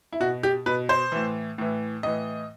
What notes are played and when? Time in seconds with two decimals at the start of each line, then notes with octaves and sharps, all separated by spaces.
0.13 E4
0.21 B2 F#4
0.43 G4
0.66 B2 B4
0.89 C5
1.12 A2 E3
1.58 A2 E3
2.03 A2 E3 D#5